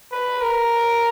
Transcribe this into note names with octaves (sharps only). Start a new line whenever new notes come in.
B4
A#4